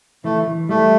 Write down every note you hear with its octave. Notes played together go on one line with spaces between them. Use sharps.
E3 A3
E3
G3 A3